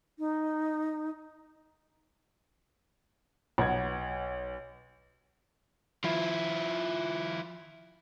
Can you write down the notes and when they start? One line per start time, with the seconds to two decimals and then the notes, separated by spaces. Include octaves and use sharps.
0.19 D#4
3.58 B1 B4 D#5 F#5 G#6
6.04 F3 E4